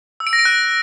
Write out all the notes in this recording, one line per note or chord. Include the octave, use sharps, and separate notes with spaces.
E6
D7
A#6
D7
F#6